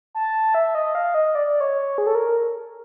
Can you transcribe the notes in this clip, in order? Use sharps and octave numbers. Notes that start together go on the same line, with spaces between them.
A5
E5
D#5
F5
D#5
D5
D5
C#5
G#4
A4
A#4